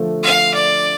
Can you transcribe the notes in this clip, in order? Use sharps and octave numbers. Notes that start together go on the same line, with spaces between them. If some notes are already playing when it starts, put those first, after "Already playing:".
Already playing: D3 F3 A3
F5
D5